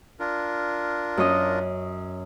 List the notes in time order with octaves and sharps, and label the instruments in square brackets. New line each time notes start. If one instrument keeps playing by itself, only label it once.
[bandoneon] D4 F4 A#4
[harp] F#2 C#5 D#5